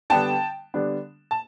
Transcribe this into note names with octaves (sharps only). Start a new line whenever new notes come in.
D3 G3 B3 D4 G5 A5
D3 G3 B3 D4
A5